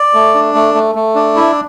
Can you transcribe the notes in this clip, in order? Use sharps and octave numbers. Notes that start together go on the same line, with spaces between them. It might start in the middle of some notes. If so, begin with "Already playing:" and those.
Already playing: D5
A3
D4
A3
A3
A3
D4
E4